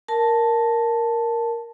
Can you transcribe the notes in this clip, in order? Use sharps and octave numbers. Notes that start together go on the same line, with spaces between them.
A#4 A5